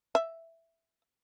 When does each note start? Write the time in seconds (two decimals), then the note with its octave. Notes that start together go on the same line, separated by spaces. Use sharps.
0.15 E5